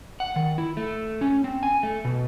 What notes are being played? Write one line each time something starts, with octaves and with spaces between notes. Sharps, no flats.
F#5
D#3
E4
A3
C#4
C4
G#5
A3
B2